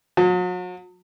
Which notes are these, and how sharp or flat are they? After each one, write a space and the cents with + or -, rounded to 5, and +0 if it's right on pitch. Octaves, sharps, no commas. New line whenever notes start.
F#3 -40